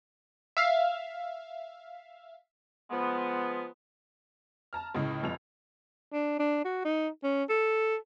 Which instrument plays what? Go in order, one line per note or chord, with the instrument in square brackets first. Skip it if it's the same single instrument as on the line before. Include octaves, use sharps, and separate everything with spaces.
[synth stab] E5 F5
[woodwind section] F3 G#3 B3
[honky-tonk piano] A5 A#5 F6
C#2 A2 C#3 D#5
F1 F2 F7
[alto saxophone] D4
D4
F#4
D#4
C#4
A4